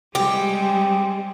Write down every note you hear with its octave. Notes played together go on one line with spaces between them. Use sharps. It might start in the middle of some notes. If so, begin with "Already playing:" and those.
G3 G#3 C4 G4